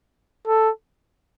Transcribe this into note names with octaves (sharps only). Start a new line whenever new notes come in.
A4